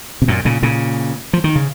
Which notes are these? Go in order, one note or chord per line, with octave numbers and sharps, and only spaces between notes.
C3
F#2 A#2
A#2 C#3
A#2 C#3
F3
D#3
C#3